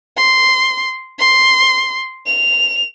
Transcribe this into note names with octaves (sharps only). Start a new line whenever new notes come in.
C6
C6
F7